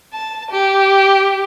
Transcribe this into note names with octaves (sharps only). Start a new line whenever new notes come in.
A5
G4